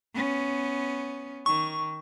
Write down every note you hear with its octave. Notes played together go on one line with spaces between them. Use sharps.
B3 C#4
D#3 C#6